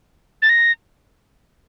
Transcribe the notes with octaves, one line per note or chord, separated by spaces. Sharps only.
A6
A#6